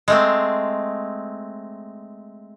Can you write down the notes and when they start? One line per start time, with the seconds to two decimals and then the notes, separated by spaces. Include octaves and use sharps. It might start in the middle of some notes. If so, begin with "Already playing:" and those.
0.08 G#3 A3 C4